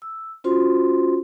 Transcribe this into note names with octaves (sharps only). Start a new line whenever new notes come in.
E6
C#4 F4 F#4 C5 C6